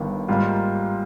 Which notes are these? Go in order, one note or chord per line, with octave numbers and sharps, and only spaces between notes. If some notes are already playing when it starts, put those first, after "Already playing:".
Already playing: G1 G2 D#3
G#2 G3 A#3 F4